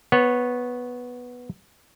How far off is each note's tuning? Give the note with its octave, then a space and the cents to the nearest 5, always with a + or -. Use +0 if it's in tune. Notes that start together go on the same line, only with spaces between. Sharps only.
B3 -5 C#5 -15